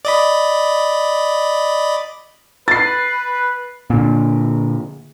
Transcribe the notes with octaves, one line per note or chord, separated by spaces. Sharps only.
D5 D#5 B5
B4 A6 C7
A#2 D3